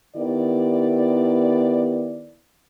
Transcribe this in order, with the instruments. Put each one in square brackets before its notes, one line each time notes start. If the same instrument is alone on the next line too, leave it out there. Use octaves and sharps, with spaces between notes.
[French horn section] D#3 B3 E4 G4 D5